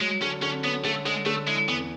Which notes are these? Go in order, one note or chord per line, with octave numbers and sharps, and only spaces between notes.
F#3 G#3
D3 C#4
D3 C#4
B3 C#4
D3 A3
D3 G#3
D3 A3
G#3 E4
E2 B3